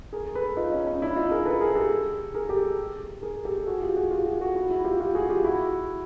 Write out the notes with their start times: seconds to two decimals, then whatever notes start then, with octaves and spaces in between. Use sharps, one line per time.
0.13 G#4 A#4
0.35 A4 B4
0.57 D#4 F4
0.72 C#4 D#4
0.87 C#4 D#4
1.02 D4 E4
1.16 D#4 F4
1.31 G#4 A#4
1.45 A4 B4
1.61 G#4 A#4
1.75 G4 A4
2.34 G#4 A#4
2.49 G4 A4
3.22 G#4 A#4
3.45 G4 A4
3.67 F#4 G#4
3.81 F4 G4
3.96 F#4 G#4
4.11 F4 G4
4.25 F#4 G#4
4.41 F#4 G#4
4.55 E4 F#4
4.70 E4 F#4
4.84 F4 G4
5.00 F4 G4
5.14 F#4 G#4
5.29 F4 G4
5.44 E4 F#4